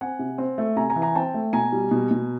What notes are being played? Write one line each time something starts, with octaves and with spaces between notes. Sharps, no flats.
C4 F#5 G#5
C3
C4
A3
C3 G#5 A#5
G#5 A#5
E3
G#5 A#5
C4 G5 A5
A3
B2 G#5 A#5
G3
B2
B2